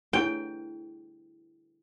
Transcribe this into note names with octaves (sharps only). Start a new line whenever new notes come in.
E4 G#4 G5